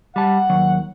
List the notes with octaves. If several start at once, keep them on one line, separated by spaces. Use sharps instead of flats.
G3 F#5 A5
D#2 F#3